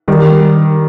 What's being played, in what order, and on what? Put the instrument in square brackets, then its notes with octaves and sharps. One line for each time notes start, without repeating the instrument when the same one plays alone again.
[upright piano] D#3 G3